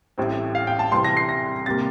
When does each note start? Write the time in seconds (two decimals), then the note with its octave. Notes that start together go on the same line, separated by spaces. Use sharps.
0.18 A1 A2 G3 C4
0.55 F5
0.67 G5
0.79 A5
0.92 C2 C3 E3 G3 C4 C6
1.04 A#6
1.17 C7
1.29 A#6
1.66 C3 G3 A#3 A6